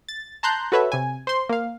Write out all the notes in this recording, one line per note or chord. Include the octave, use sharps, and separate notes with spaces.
A6
A5 A#5 C6 F#6 G6
F#4 A4 B4 C#5 E5
C3 G#5
C5 C6
A#3 F5